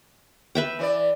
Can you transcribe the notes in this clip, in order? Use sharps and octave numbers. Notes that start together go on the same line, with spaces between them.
B4 E5 G5
E3 C#5 D5